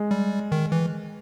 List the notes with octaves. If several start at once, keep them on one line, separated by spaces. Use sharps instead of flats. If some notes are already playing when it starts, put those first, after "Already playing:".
Already playing: G#3
G3
D#3
E3